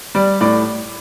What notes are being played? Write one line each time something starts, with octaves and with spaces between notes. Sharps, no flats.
G3 D5
A2 D5